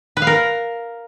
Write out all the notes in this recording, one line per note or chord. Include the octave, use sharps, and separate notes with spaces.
B4
F5
A#4